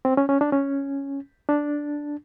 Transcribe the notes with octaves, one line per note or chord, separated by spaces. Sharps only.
C4
C#4
C#4
D4
C#4
D4